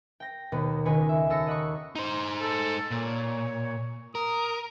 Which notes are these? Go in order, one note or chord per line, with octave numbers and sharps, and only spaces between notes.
G5 A#6
D#2 B2 B3
C#2 D#3 B4 G#5 C#7
E5
D#2 A4 E6 A#6 C#7
D#5 F#5 B5 C#6
D#4 C5
A4
A#2 C#5
A#4 D#6